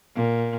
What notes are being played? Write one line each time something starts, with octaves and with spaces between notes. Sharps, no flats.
A#2